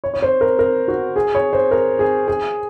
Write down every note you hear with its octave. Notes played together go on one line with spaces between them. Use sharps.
C#5
C#5
C5
A#4
A#4
F#4
G#4
C#5
C5
A#4
G#4
G#4